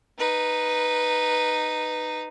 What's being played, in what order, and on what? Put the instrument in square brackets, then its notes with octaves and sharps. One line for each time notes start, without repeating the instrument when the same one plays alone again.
[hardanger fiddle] D#4 B4